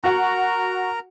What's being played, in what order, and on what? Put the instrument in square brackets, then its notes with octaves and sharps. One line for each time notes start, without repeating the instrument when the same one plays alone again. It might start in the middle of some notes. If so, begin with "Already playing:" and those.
[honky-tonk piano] F#4 F#5 [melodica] A#4 A#5